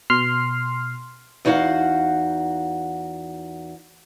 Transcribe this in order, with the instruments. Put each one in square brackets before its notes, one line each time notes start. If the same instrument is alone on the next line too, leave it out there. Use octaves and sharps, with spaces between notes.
[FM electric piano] B2 C6 F6 C7
[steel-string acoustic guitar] E2 D#4 F#4 F5 F#5